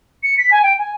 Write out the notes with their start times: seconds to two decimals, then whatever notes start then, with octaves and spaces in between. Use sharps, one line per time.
0.23 C#7
0.38 B6
0.51 G#5
0.63 G5
0.78 G#5